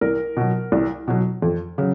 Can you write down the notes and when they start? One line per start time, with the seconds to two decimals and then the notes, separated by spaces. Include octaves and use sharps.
0.01 C2 A#4
0.37 B2 F#3
0.72 C2
1.08 B2 F#3
1.42 F2
1.78 C#3 F#3